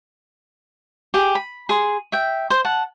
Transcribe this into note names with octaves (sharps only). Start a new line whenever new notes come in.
G4 G#4
B5
G#4 C6
E5 G5
C5
F#5 A5